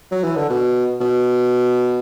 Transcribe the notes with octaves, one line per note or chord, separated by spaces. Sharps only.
F#3
E3
D3
B2
B2